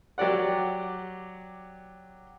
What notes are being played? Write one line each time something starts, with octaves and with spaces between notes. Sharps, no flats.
F#3 G4 D5 F#5